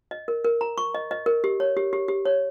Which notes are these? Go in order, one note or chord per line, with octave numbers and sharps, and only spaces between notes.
D#5
A#4
A#4
A#5
C#6
D#5
D#5
A#4
G4
C#5
G4
G4
G4
C#5